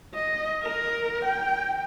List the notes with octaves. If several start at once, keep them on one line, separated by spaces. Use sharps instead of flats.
D#5
A#4
G5